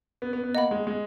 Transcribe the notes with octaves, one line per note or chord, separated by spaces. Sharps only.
B3
B3
B3
A#3 D#5 F#5 B5
G#3
G#3